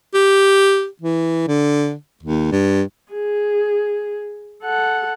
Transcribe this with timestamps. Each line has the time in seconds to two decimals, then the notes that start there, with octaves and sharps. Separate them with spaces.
0.14 G4
1.01 E3
1.48 D3
2.23 D#2
2.52 G2
3.12 G#4
4.63 A4 F#5